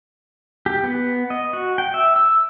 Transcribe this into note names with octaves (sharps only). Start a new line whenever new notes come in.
G4
B3
D#5
F#4
G5
E5
E6